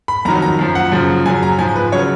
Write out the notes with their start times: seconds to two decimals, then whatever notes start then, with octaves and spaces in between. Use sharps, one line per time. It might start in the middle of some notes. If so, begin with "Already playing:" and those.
0.08 B5
0.25 F2 D#3 F#3 A#5
0.42 A#5
0.59 F#2 F3
0.75 F#5
0.92 F#2 C#3 F3
1.26 F#2 C#3 F#3 G#5
1.43 A#5
1.59 G#2 F3 G#5
1.76 B4
1.92 C#3 F#3 C#5